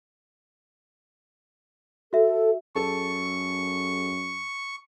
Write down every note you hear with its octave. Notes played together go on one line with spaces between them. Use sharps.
F#4 A4 E5
F#2 G#4 A4 A5 C#6